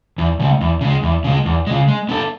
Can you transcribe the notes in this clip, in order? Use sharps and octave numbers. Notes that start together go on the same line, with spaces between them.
E2
C#3 G#3
E2
C#3 G#3
E2
C#3 G#3
E2
C#3 G#3
G#3
B3 D4 A4